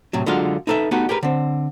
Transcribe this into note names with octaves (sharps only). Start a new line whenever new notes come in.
A2 C3 F#3
D3 F#3 G#3 D4 F4 F5
D#4 E4 A4 B4 E5
A3 B3 D#4 F#4 G4 B4
G4 G#4 A#4 B4
D3 C4